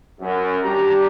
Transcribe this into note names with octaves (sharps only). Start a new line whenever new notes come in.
F#2
G3 D4 G4 A#5